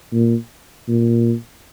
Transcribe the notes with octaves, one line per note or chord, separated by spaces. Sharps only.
A#2
A#2